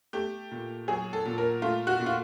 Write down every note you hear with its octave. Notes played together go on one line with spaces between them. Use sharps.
A3 G4
A#2
F#3 G#4
A4
A#2
A#4
A3 F4
F#4
A#2
F4